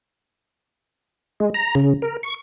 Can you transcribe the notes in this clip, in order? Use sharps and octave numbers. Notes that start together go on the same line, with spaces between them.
G#3
A#5
C#3
A#4
C#6